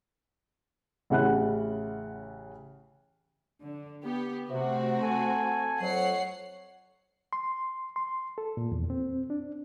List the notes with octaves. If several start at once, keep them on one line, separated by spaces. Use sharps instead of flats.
A1 C#3 E4 F#5 B5 F#6
D3
B3 G4
C3 A3 C4 F#4
A4 G#5
F2 F#3 C#5 F#5 C7
C6
C6
A4
A#2
E2
C4
D4